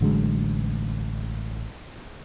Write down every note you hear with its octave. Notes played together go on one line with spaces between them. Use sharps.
A1 D3 F#3 G#3